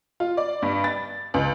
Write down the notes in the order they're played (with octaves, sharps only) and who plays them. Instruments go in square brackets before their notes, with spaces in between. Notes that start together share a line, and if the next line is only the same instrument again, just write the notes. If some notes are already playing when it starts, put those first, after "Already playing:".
[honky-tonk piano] F4
D5
G2
A6
C#2